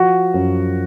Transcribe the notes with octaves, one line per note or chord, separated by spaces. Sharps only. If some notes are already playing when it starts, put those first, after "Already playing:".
Already playing: F3 F#4
F#2